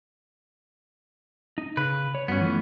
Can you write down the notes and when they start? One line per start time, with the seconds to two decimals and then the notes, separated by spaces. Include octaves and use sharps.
1.58 D#4
1.77 C#3 B4
2.15 C#5
2.28 G2 B3 C#4 F#4
2.41 E3 F3 A3